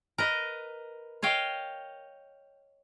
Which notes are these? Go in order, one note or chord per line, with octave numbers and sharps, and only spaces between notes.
A#4 B4 D#5
C#5 D#5 F5 G5